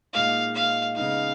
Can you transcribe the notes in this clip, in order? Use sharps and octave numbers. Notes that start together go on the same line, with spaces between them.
A#2 G#3 D#4 F5
F5
C#3 G#3 B3 D#4 F5